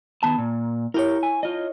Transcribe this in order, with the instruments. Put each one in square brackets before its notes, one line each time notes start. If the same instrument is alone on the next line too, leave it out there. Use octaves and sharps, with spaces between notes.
[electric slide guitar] D#3 B3 A5
A#2
[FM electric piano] E4 C#5 [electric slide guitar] G4 A#4
[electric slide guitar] G#5
F4 D#5